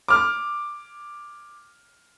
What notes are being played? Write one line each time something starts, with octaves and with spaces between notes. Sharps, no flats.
D6 F6